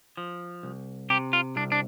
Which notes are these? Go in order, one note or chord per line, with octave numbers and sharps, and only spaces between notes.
F3
C2
C3 G4
F4
C2 D4
D4